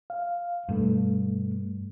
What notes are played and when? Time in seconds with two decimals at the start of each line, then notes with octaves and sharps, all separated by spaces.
0.10 F5
0.69 G2 B2 A3